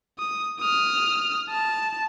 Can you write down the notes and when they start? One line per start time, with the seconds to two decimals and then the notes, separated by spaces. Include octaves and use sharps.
0.19 D#6
0.60 D#6 F6
1.50 A5